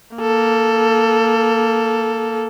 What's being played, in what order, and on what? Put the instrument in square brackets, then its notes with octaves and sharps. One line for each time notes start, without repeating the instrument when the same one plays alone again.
[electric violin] A#3 A4